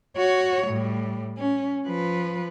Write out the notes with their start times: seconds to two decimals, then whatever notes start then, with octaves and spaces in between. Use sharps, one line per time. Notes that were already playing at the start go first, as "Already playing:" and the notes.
0.16 F#4 C#5
0.67 A2 G3
1.38 C#4
1.86 F3 B4